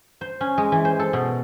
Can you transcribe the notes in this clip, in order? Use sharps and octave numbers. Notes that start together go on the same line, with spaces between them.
C5
C#4
G#3
E3
C5
A4
B2